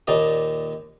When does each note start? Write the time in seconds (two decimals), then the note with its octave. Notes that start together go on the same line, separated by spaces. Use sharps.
0.07 D#2 A#2 D#4 D5 D#5